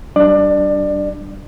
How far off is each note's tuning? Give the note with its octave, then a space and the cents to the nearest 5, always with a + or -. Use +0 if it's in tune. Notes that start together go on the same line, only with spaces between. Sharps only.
G3 -20 D4 -5 D5 +25